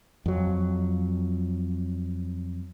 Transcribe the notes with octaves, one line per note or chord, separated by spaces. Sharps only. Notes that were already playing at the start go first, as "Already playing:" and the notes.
F2 F#3